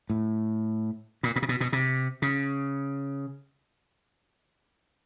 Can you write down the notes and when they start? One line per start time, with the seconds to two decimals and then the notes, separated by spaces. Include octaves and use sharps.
0.10 A2
1.23 A#2
1.36 A#2
1.42 C3
1.49 B2
1.60 B2
1.73 C3
2.22 C#3